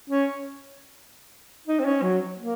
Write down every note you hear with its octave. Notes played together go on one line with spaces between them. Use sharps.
C#4
D#4
C4
C#4
F#3
A#3